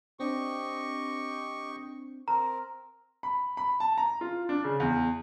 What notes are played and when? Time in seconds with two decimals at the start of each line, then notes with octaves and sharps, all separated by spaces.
0.20 C4 D4 G4 D#5 G5 C#6
2.28 C4 A#4 A#5
3.23 B5
3.57 B5
3.80 A5
3.98 A#5
4.21 F4
4.49 D4
4.64 C#3
4.80 E2